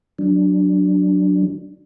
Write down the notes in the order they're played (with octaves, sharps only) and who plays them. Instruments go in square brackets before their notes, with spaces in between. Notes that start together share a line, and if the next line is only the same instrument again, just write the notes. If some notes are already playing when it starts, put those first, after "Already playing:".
[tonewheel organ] F#3 D4